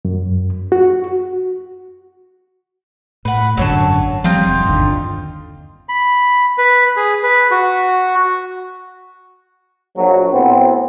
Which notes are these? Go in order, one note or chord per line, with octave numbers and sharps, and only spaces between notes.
F#2
F#4
A2 B4 F#5
G#1 F#2 D3 F#3 C#5 A5
F3 G3 C4 D#4 F4
E1
G1 D#2 D3
B5
B4
G#4
B4
F#4
A#1 F#3
A2 B3 C4